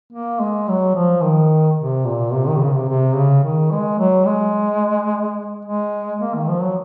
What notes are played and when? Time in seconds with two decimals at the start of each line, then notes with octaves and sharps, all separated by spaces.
0.12 A#3
0.40 G#3
0.68 F#3
0.96 F3
1.23 D#3
1.78 C3
2.06 A#2
2.33 C3
2.47 D#3
2.57 C3
2.61 C#3
2.75 C3
2.88 C3
3.16 C#3
3.44 D#3
3.71 G#3
3.99 F#3
4.26 G#3
5.65 G#3
6.20 A#3
6.35 D#3
6.48 F3
6.62 F#3